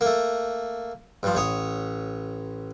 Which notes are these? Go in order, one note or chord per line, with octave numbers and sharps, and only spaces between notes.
A3 A#3
G2 F3
A1 C#5 D#6